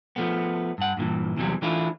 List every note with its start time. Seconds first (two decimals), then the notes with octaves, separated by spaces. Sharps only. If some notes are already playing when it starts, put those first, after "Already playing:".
0.16 F3 A3 B3
0.78 G2 F#5
0.97 G2 A#2 D#3 E3
1.37 E2 C3 E3 F#3 G3
1.62 E3 A3 D4 E4 F4